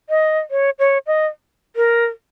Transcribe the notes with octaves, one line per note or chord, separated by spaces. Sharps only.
D#5
C#5
C#5
D#5
A#4